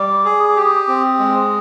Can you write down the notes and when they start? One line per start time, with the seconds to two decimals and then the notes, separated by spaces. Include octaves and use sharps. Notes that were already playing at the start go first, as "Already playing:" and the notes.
Already playing: G3 D6
0.25 G#4
0.38 D#6
0.50 D6
0.56 G4
0.62 D#6
0.88 C4
1.19 G#3